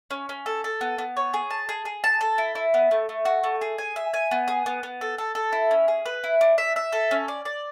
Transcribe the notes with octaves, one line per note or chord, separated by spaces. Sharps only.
C#4
C#4
A4
A4
B3
B3
C#5
G#4
A5
G#4
G#4
A5
A4
E4
E4
B3
A3
A3
F#4
A3
G#4
G#5
E5
G#5
B3
G#4
B3
B3
A4
A4
A4
E4
C#4
G#4
B4
E4
D4
E5
E5
A4
C#4
D5
D5